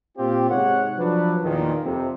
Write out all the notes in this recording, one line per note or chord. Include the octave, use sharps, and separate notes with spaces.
A#2 C4 F4 G4
G#2 C3 C4 C#5 F#5
F3 F#3 D4 B4
E2 A#2 D#3
F2 C3